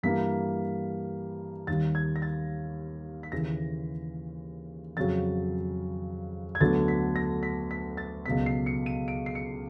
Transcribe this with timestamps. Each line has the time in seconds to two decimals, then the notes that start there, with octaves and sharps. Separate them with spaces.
0.03 G2 E3 G3 A#3 B6
1.67 D#2 D#3 G3 A6
1.95 G#6
2.16 A#6
2.22 A6
3.23 B6
3.32 D#2 C#3 E3 A#6
4.97 F2 C#3 F#3 A6
6.55 G#6
6.61 D2 D3 F#3 B3 A6
6.88 B6
7.16 A#6
7.43 B6
7.71 B6
7.97 A6
8.25 C#2 B2 F#3 B3 B6
8.46 C7
8.66 C#7
8.86 D#7
9.08 D7
9.26 C7
9.35 C#7